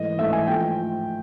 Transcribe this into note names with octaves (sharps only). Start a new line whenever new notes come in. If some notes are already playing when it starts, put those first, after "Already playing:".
Already playing: G#2 E3 A3 D#5
G#2 E3 A3 E5
G#5
G#2 F3 A3 G5